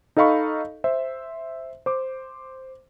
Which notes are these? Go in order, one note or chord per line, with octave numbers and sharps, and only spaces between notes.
D#4 A4 D#5 F5 B5 C#6
C5 E5
C5 D6